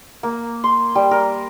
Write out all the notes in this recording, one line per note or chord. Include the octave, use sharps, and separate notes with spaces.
A#3
C6
G3
A#4